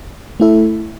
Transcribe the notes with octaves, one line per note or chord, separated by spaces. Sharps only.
A3 E4 A4 E5